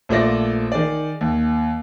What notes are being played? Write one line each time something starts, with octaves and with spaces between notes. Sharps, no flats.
A#1 A3 F4 D5 A#6
D#3 G#4 D5
D#2